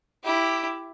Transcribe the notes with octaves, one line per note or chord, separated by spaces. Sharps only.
E4 G4